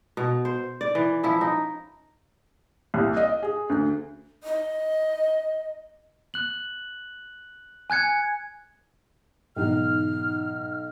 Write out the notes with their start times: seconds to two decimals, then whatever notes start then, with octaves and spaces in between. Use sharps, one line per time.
0.17 B2
0.45 C5
0.81 D5
0.95 E3
1.23 F3 C#4 E4
1.41 D#4
2.94 C2
3.17 D#5
3.43 G#4
3.70 D2
4.43 D#5
6.34 F#6 F#7
7.90 G#5 F#6 G#6 C#7
9.56 B1 G#2 E3 D#4 F6